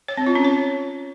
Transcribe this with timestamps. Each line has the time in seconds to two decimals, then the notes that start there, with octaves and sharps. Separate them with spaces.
0.08 C#5
0.17 C4
0.26 F4
0.35 C#4
0.44 C#5